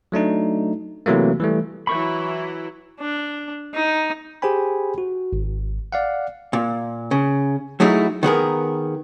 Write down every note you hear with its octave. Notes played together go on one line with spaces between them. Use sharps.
F#3 A3 D4 D#4
C3 E3 F#3 A3 A#3
E3 G3 A3
E3 F#3 E4 B5 C#6
D4
D#4
G4 G#4 C5 G5 G#5 B5
F#4
G#1
D5 F5 F#5
A#2
C#3
F#3 A3 D#4 E4 G#4
D#3 B3 G#4 A#4